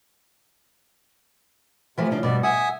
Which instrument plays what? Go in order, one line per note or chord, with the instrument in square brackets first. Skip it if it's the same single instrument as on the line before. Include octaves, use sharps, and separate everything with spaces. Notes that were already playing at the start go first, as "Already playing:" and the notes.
[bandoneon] C3 [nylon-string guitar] E3 F3 A3
[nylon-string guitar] C#3 F3 D4
[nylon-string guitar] G2 B2 [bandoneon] D5
[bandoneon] E5 G#5 D#6 [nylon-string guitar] F#5